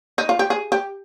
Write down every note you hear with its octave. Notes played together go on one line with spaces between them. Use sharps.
D#4
F4
G4
G#4
G4